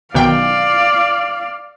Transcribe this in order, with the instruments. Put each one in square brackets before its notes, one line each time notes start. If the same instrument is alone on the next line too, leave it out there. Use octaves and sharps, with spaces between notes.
[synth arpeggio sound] B1 D#3 G5 [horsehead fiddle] D5 F5